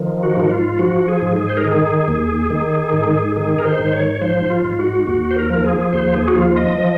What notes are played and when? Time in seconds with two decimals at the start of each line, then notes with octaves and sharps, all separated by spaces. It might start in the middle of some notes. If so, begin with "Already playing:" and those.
Already playing: D#3 F3
0.23 F#4
0.37 G#2 F#4
0.51 F4
0.79 F3 F#4
1.08 G#4
1.22 G#2
1.36 G#4
1.49 C5
1.57 A#4
1.64 D#3 G#4
2.08 D#2
2.50 D#3
2.93 G#2
3.36 D#3 G#4
3.59 A#4
3.65 C5
3.79 G#2
3.93 C#5
4.15 C#5
4.21 F3 C5
4.50 F4
4.64 G#2
4.79 F#4
5.07 D#2 F#4
5.31 C5
5.36 A#4
5.50 F3
5.64 G#4
5.93 D#2 C5
6.14 G#4
6.28 F#4
6.36 F3 F4
6.57 D#5
6.78 F3